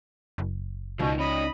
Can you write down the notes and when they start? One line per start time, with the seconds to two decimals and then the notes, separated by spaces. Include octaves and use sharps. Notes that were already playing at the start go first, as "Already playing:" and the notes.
0.38 F#1
0.99 C#2 B2 F3 D#4
1.19 C#4 D#4 D#5 B5 D#6